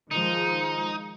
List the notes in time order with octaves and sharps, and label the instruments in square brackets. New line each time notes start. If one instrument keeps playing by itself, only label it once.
[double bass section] D#3 F3 G#3 [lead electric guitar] D#4